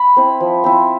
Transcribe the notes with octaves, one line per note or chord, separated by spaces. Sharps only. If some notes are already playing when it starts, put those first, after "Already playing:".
Already playing: B5
C4 E4
F3
C4 E4